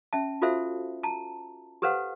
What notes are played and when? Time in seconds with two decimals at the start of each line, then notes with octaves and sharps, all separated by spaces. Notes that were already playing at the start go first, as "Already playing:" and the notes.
0.13 C#4 E5 A5
0.42 F4 F#4 A4 C5 E5 F5
1.03 A5 A#5
1.82 G4 A4 B4 C5 F5 F#5